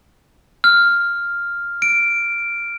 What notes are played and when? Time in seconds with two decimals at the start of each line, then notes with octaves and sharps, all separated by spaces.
0.64 F6
1.82 D7